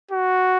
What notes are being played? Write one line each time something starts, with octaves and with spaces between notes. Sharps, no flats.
F#4